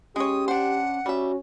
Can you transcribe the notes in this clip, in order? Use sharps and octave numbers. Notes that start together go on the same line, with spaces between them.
G#3 C#4 G4 C#5 D#6
D4 C5 F#5
G3 C#4 F#4 E5